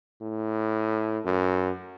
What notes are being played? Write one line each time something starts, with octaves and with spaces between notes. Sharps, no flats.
A2
F#2